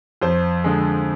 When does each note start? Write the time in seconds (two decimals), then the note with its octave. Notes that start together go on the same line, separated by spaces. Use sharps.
0.22 F2 C5
0.64 D3 G#3